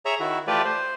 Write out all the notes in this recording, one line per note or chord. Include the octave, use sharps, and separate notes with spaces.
G#4 C#5 E5 A#5
D#3 E4 F#4
E3 A3 F4 G4 B4 D5
C5